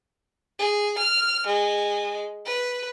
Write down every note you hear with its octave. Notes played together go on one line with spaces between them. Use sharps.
G#4
F6
G#3
B4